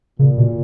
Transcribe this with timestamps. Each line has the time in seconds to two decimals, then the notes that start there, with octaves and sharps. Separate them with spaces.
0.19 A#2 C#3
0.38 B2